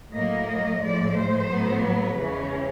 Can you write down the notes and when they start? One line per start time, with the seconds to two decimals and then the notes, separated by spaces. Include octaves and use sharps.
0.14 A2 F#3 A#3 D#5
0.48 D#5
0.81 A2 F3 G#3 D5
1.15 C5
1.49 A2 F#3 B3
1.82 B4
2.16 E2 C#3 E3 G#3 C#4